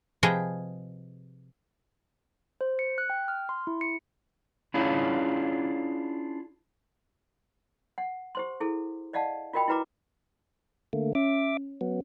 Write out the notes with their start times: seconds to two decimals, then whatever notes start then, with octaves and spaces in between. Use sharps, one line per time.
0.23 C3 F3 G#4 B4 D#5 G5
2.61 C5
2.79 C#7
2.98 F#6
3.10 G5
3.28 F6
3.49 C6
3.67 E4
3.81 C#7
4.74 C#4 D4 E4 F4 G#4 C#5
7.98 F#5
8.35 G4 C5 C6
8.60 E4 G#4 A4
9.13 D5 D#5 F5 F#5 A5
9.53 F4 F#4 A#4 D#5 G5 B5
9.68 E4 F#4 B4 A#5 D6
10.93 D3 A3 A#3
11.15 C#4 E5 D6
11.81 F#3 B3